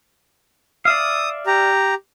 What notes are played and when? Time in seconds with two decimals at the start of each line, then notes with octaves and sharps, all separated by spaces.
0.85 D5 E5 F5 D#6
1.47 G4 A#5